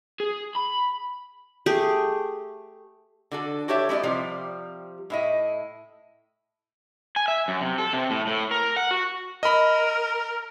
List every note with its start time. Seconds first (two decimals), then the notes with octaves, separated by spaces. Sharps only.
0.20 G#4
0.55 B5
1.66 A3 G4 G#4
3.31 D3 F#4 A4
3.68 F#4 G4 A4 C#5 E5
3.89 G#3 E4 F#4 D5 D#5
4.03 C3 F3 G3
5.10 A2 E4 D#5
7.16 G#5
7.28 E5
7.48 F#2
7.61 C3
7.78 A4
7.93 C3
8.10 A2
8.27 A2
8.51 A#4
8.76 F#5
8.91 F#4
9.43 A#4 D#5 B5